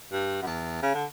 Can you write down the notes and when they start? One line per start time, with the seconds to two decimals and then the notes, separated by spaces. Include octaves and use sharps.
0.12 G2
0.42 F#2
0.47 E2
0.82 C#3
0.95 D3